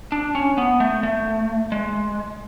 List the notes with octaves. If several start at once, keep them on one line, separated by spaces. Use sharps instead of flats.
D4
C#4
B3
A3
A3
G#3